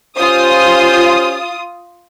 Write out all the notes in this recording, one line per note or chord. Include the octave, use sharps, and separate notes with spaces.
C#4 F4 G4 C5 D#6